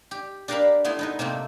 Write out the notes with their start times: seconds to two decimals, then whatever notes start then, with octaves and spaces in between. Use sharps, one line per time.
0.11 G4
0.48 D4 G4 A#4 F5 A5 B5
0.85 A3 B3 E4 C6
0.99 B3 D#4 B4
1.19 C3 A3 A#3 C4